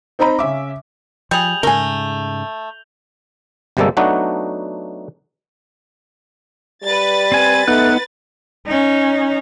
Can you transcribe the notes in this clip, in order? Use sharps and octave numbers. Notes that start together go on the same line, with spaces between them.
C4 D#4 C5 D#5 A#5 B5
C#3 C#4 E5 D6
F3 G3 G#4 G6 F7 F#7
G#2 C#3 A3 A#4 G#5 G7
G1 C3 G3 G#3 A#3 A4
F#3 A3 B3 D4 D#4 F#4
G3 B4 A6
C4 G#5
A3 B3 D#4 F#5 F#6
C#4 D#4